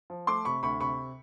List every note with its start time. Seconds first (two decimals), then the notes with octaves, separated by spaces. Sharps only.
0.10 F3
0.27 A3 C6 D6
0.45 C3 B5 C#6
0.63 D2 B5 C#6
0.81 C3 B5 C#6